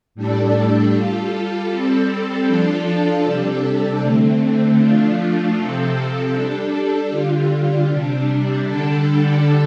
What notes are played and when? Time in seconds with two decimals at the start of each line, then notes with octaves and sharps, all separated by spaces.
0.15 A2 G3 D4 A4
0.92 G3 F4 A4
1.69 G3 C4 A4
2.47 F3 D4 F4 A4
3.24 C3 G3 D4 A4
4.01 D3 A3 C4
4.78 F3 A3 D4 F4
5.56 C3 F3 C4 A4
6.33 G3 D4 A4
7.10 D3 G3 F4
7.87 C3 G3 D4
8.65 D3 G3 D4 A4